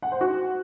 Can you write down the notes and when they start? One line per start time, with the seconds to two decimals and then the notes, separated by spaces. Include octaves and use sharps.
0.02 F#5
0.12 C5
0.21 F#4